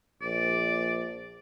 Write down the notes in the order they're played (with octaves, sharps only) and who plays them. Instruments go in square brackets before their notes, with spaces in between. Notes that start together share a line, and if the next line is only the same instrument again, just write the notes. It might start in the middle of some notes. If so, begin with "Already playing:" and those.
[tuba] A#1 [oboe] D5